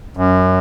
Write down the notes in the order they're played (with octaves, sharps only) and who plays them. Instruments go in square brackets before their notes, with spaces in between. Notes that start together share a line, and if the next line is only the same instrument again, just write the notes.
[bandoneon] F#2